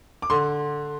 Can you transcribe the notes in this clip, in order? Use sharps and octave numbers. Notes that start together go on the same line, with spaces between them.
D6
D3 C6